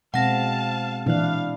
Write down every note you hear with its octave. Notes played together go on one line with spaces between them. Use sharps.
B2 G#3 C4 F5 F#5 A5 A#6
A#2 E3 D4 E4 F5 F#6